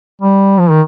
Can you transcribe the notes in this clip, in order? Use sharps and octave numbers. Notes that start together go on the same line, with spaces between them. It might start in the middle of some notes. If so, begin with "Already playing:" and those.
G3
F3
D#3